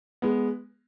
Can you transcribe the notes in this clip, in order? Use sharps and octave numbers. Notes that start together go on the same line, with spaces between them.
G#3 B3